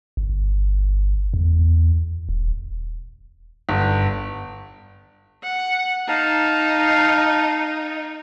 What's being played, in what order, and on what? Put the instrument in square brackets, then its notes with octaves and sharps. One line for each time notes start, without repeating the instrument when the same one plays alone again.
[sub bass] G1
E2
D#1
[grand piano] G1
[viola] F#5
[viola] D#4 [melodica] F5 A5 A#5